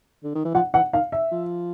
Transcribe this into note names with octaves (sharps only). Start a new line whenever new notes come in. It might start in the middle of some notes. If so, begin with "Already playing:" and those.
D3
D#3
E3
F3 F#5
E3 F#5
D#3 F5
E5
F3